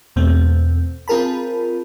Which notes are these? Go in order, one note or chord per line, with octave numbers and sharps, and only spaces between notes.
E2 B2 A3 C4
C4 F4 G#4 A#4 A5 B5